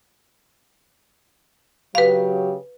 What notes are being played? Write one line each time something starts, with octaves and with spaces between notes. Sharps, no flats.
C#3 F#3 G4 B4 F5